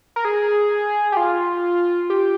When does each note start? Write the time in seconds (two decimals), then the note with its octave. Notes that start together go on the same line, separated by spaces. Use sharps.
0.16 A#4
0.25 G#4
1.12 G4
1.17 F4
2.10 G4